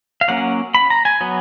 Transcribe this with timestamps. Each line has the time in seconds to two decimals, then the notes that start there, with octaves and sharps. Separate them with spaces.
0.21 F5
0.28 F#3 A#3 C#4 F#5
0.75 B5
0.90 A#5
1.05 G#5
1.21 F#3 B3